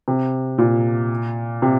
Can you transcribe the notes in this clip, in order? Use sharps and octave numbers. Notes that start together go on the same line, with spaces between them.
C3
A#2
C3